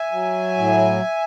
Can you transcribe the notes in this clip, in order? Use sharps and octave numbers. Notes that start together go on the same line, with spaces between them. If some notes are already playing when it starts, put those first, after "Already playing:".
Already playing: E5 G#5
F#3
A2